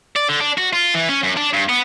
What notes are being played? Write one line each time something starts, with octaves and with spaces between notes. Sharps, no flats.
D5
D3
D4
F#4
F4
E3
C#4
F#2
D4
G2
B3